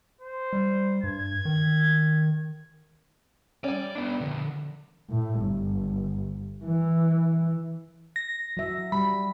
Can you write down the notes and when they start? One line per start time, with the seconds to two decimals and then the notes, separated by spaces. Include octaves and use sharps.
0.21 C5
0.53 G3
1.04 G2 G#6
1.45 D#3
3.64 G3 C#4 D5
3.95 B3 D4
4.21 D3 F3
5.10 A2
5.42 G1
6.64 E3
8.16 A#6
8.57 F#3 E5
8.92 G3 B5